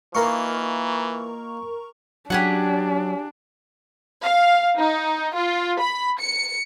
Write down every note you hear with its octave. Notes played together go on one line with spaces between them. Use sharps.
E3 A#3 D#4 F4 A#4 A#5 C#6
F#3 C#4 D4 G4 G#4 F#5
F5
D#4
F4
B5
C#7